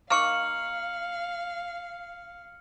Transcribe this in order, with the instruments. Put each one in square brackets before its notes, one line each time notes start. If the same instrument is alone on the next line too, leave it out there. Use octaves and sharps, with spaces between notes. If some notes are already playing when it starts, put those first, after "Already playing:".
[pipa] A#3 D#4 C#6 [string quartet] F5 [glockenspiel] F6 C#7 F#7